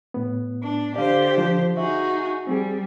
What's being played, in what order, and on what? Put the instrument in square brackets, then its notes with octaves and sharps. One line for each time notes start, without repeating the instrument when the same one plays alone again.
[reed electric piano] A2 B3
[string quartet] D4
[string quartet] D3 G4 C5 [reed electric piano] D5 F5
[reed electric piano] F3
[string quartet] D#4 F#4 G#4 [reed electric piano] E5
[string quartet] G3 [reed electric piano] C4 G#4